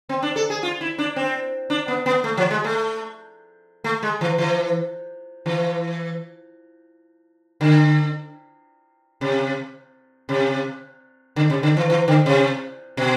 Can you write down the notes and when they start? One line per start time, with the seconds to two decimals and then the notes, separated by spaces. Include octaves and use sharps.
0.09 C4
0.23 D4
0.36 A4
0.50 G#4
0.63 F4
0.81 E4
0.98 D4
1.16 C4
1.70 D4
1.88 B3
2.06 B3
2.24 A3
2.37 F3
2.51 G#3
2.64 A3
3.84 A3
4.03 G#3
4.21 E3
4.38 E3
5.46 E3
7.61 D3
9.21 C3
10.29 C3
11.36 D3
11.50 C3
11.63 D3
11.77 E3
11.90 E3
12.08 D3
12.26 C3
12.97 B2